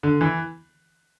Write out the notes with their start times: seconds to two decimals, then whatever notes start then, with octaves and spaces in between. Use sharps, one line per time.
0.03 D3
0.21 E3